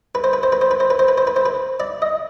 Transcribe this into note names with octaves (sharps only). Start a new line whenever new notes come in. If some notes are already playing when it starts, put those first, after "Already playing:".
B4
C5
B4
C5
B4
C5
B4
C5
B4
C5
B4
C5
B4
C5
B4
D5
D#5